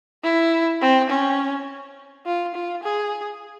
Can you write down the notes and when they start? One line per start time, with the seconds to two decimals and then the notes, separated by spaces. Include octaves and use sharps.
0.24 E4
0.82 C4
1.10 C#4
2.26 F4
2.55 F4
2.84 G#4